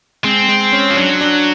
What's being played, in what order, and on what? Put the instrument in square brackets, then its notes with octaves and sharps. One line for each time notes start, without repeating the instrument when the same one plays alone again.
[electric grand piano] G#3 [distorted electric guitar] C4
[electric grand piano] G#3
C#4
[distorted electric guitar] F3
[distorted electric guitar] F#3 [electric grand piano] D4
[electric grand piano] D4